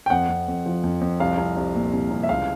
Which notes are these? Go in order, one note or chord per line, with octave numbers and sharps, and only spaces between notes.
G5
F2 F#5
F2
F2
F3
F2
F2
C2 F5
C2
C2
A#2
C2
C2
E5
C#2 F5